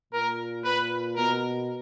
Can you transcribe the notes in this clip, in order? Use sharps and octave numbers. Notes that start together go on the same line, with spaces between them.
A#2 A#4
A#2 B4
B2 A#4